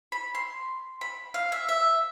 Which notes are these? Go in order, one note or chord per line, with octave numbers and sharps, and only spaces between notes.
B5
C6
B5
F5
E5
E5